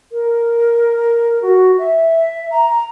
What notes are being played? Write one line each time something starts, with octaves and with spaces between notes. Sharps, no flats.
A#4
F#4
E5
A#5